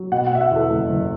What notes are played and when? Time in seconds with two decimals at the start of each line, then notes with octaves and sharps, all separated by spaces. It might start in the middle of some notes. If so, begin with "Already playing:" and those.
Already playing: F#3
0.12 B2 F#5
0.27 F#5
0.32 B2 E5
0.41 F#5
0.51 E2 A4
0.71 F#1
0.90 F#1